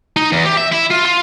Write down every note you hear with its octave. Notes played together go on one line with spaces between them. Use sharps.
D#4
E2
G4
E5
E4
F4
F4